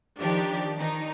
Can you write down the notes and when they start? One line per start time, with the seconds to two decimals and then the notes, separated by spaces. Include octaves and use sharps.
0.19 D#3 F3 D4 D#4 G4
0.78 D#3 D#4